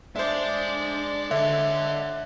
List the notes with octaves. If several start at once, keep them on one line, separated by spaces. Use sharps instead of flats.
G#3 D4 C5 D5 E5
D3 C#5 D#5 E5